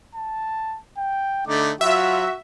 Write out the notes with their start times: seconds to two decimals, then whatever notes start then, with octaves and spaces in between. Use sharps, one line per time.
0.15 A5
0.98 G5
1.47 D3 A3 D#4 D6
1.81 F#3 F4 F#4 E5